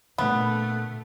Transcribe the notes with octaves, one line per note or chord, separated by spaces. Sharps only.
A#2 D3 A3 B3